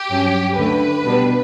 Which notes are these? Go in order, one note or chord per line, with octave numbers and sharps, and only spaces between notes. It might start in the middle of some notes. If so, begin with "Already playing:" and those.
Already playing: G4
G2 F#3 C#4
D2 D3 A3 B4
B2 G3 B3 D4